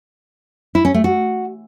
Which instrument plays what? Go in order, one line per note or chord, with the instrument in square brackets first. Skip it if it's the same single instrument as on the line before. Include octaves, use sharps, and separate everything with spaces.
[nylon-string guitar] E4
C#4
A3
F#4